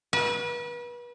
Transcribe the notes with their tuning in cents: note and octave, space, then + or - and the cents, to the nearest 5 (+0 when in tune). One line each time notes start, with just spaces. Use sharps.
B4 -35